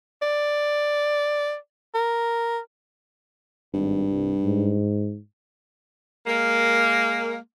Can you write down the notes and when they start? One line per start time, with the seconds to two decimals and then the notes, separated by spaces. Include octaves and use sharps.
0.22 D5
1.95 A#4
3.74 G#1 G2
4.10 C2
4.44 G#2
6.27 G#3 A#3